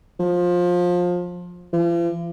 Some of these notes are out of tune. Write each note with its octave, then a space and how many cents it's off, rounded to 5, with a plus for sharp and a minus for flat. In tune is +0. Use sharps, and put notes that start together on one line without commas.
F3 +20
F3 -45